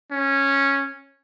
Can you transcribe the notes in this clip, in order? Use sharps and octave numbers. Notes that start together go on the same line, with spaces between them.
C#4